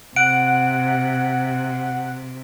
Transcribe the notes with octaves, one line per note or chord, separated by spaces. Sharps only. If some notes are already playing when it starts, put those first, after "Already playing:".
C3 F#5 D7